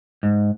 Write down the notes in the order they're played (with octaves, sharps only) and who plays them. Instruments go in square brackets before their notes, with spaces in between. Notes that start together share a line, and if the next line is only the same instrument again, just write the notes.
[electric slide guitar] G#2